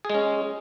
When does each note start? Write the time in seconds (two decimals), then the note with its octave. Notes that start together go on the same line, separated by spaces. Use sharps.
0.05 G#4
0.10 G#3
0.15 C#4